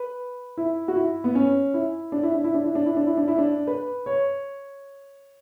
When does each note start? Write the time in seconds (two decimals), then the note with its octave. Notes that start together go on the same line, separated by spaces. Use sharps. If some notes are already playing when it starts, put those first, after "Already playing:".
Already playing: B4
0.57 E4
0.88 F#4
0.96 E4
1.24 B3
1.35 C#4
1.74 E4
2.12 D4
2.23 E4
2.34 D4
2.44 E4
2.54 D4
2.65 E4
2.75 D4
2.86 E4
2.97 D4
3.07 E4
3.17 D4
3.28 E4
3.38 D4
3.67 B4
4.06 C#5